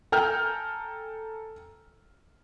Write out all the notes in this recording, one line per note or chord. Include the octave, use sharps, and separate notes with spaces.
A4 G5 G#5 A#5 F6 G6